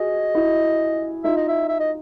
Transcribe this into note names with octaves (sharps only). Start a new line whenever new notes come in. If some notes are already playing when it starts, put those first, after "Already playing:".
Already playing: F#4 G#4 D#5
E4 F#4
D#4 F4 E5
D#5
E5
E5
D#5